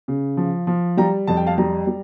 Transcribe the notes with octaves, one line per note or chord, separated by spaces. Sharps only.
C#3
F3
F3
G3 G5 A#5
F2 A5
G5
F5 A5
G3 G5 A#5
G3